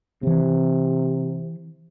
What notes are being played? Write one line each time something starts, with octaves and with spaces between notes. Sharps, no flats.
C3 E3 C4